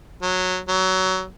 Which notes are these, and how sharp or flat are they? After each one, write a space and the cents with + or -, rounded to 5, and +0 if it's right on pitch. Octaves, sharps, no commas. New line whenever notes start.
F#3 -10
F#3 +20